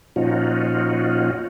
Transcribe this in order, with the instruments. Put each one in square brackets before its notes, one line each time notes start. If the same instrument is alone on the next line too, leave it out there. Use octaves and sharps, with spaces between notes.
[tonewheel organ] A#2 F3 C#4 D#4 F4 F#4